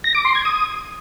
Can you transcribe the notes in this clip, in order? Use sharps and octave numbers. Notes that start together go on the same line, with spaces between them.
A#6
D6
C6
G#6
D#6